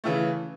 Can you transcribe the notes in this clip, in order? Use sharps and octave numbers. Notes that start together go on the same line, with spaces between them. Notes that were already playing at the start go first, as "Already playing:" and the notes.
C#3 E3 A3